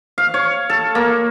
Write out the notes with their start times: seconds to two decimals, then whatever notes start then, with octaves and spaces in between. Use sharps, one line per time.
0.18 F5
0.34 C#5
0.70 A4
0.95 A#3